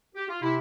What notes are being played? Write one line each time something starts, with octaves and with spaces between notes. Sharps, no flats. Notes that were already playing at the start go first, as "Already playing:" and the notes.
G4
F4
C3 E4